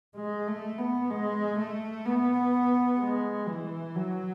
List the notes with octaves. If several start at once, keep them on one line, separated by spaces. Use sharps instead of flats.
G#3
A3
B3
G#3
A3
B3
G#3
E3
F#3